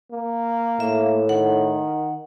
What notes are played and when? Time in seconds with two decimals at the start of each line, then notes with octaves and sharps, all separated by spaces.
0.12 A#3
0.80 A2 E5
1.29 D#3 F#5